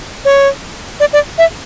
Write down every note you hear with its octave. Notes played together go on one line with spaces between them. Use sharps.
C#5
D5
D5
E5